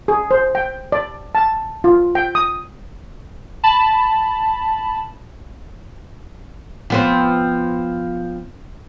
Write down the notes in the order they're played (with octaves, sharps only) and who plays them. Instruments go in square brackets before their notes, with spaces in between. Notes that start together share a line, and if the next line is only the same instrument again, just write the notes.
[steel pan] G#4
C5
G5
D5
A5
F4
G5
D#6
[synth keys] A5 B5
[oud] F3 B3 C4